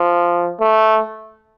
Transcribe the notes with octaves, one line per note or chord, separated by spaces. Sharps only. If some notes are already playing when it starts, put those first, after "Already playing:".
Already playing: F3
A3